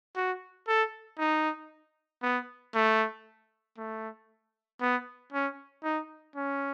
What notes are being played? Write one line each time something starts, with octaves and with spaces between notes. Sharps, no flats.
F#4
A4
D#4
B3
A3
A3
B3
C#4
D#4
C#4